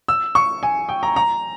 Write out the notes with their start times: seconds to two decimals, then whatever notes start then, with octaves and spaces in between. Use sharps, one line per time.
0.08 E6
0.35 C#6
0.63 G#5
0.89 G5
1.03 A#5
1.16 A#5